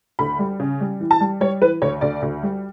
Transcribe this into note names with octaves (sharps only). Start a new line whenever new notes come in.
D2 B5
G3
C#3
G3
E3
A5
G3
G3 C#5
E3 B4
D2 C#5
D2 D5
D2
G3